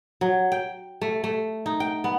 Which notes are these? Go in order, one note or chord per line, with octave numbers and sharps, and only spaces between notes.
F#3
G5
A3
A3
D#4
G5
B3